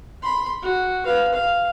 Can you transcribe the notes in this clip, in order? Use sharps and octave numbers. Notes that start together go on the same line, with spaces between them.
B5 C6
F#4
B4 F5
F5